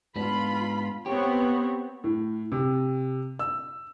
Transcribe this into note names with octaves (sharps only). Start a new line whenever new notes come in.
G#2 B3 D4 F4 B5
B3 C4 G4 C#5
A2
C3
E6